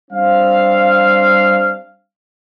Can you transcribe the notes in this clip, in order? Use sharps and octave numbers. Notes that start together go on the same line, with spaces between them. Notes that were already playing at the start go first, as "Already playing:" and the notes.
G3 C4 D4 F5